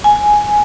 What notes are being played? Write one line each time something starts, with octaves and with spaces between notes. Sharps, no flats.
G#5